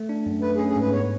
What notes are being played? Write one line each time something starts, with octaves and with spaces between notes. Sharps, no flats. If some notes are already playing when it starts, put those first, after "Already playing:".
Already playing: A3
D4
F#2
A3 B4
G#4
C#4
G#4
G#2 B4
B3 C#5